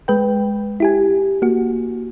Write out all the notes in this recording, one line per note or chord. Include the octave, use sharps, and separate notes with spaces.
G#3 B4 G5
E4 G4 G#5
A#3 F#4